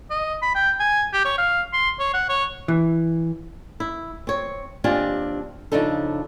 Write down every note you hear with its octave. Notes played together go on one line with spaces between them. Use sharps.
D#5
B5
G5
G#5
G4
C#5
F5
C6
C#5
F#5
C#5
E3
E4
C4 C#5
D#2 C4 D4 F4 G4 G#5
C#3 F3 D4 D#4 A4